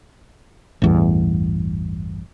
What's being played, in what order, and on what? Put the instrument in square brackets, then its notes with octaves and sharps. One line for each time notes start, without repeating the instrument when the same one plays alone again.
[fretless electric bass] A1 E2 G2